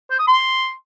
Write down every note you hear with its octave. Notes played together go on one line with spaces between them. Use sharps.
C5
D#6
C6